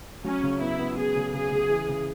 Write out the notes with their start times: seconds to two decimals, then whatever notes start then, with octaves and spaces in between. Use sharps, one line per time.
0.24 F#3 C#4
0.43 C#3
0.61 B3 E4
0.79 B3
0.97 B3 G#4
1.15 C#3
1.33 C#3 G#4
1.51 C#3
1.69 E3
1.89 C#3